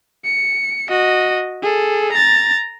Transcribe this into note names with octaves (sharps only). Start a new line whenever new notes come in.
C#7
F#4 D#5
G#4 A4
A#5 A6